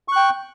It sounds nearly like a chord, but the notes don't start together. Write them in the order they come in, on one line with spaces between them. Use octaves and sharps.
C#6 F#6 G5